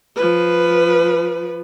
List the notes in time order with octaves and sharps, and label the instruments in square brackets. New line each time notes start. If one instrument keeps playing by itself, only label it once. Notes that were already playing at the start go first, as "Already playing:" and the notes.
[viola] F3 B4